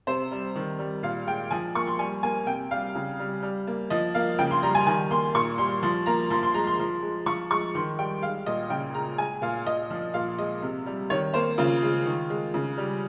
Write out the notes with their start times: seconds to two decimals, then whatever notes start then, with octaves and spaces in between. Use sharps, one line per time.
0.07 C3 C5
0.32 G3
0.55 D#3
0.79 G3
1.03 A#2 F5
1.27 G#3 G5
1.51 F3 G#5
1.75 A#3 C#6
1.87 C6
1.99 G3 G#5
2.23 A#3 G#5
2.47 C3 G5
2.71 G3 F5
2.95 C#3
3.20 G3
3.43 G3
3.67 A#3
3.90 F3 D#5
4.14 A#3 F5
4.39 C#3 G5
4.51 C6
4.63 G3 A#5
4.75 G#5
4.86 D#3 G#5
5.11 A#3 C6
5.35 A#2 C#6
5.58 G3 C6
5.83 F3 C6
6.06 A#3 A#5
6.30 F3 C6
6.43 C6
6.54 G#3 A#5
6.67 C6
6.79 F3
7.03 G#3
7.26 F3 C#6
7.51 G#3 C#6
7.75 D#3 C6
7.98 G3 G5
8.22 G#3 F5
8.46 A#2 D#5
8.70 C#3 G5
8.94 G#3 A#5
9.18 G#3 G#5
9.42 A#2 F5
9.66 A#2 D#5
9.90 F3
10.14 A#2 F5
10.38 G#3 D#5
10.62 C3
10.86 G3
11.10 D#3 C#5
11.34 A#3 C5
11.58 C#3 F4
11.82 G#3
12.06 D#3
12.30 G#3
12.54 C#3
12.78 G3